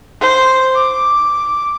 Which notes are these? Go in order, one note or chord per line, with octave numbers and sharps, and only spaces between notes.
C5
D6